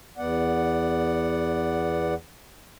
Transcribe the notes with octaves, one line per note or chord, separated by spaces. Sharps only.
E2 B3 D5 F#5